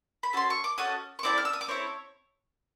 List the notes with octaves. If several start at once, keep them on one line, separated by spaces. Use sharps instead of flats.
B5
C#4 F#4 A4 C6
C#6
D6
C#4 F#4 A4 D#5 D#6
C#6
C4 E4 A4 D5 D6
F6
E6
D#6
D6
C4 E4 A4 C#5 C#6